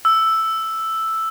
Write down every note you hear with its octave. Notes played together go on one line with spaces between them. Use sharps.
E6